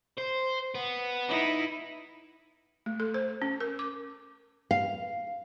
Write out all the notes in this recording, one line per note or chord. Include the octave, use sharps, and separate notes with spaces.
C5
B3
D#4 E4
A3
A4
C5
C#4
A#4
D6
F5